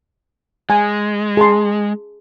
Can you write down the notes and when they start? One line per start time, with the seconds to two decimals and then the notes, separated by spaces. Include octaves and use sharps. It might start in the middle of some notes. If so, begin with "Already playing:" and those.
0.70 G#3 G#5
1.37 G#4 A5 C6